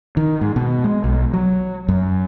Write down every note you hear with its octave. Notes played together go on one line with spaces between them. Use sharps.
D#3
G#2
B2
G#3
B1
F#3
F#2